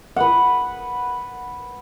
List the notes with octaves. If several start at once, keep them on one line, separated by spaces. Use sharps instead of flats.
B4 F#5